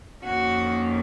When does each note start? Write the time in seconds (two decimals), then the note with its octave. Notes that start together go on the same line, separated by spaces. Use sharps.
0.25 F2 D#3 A#3 C#4 F#4